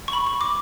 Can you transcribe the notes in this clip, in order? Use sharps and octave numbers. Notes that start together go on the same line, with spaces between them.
C#6
B5
C#6
D6